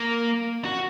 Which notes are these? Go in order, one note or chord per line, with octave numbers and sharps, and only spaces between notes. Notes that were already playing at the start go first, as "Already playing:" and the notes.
Already playing: A#3
F#4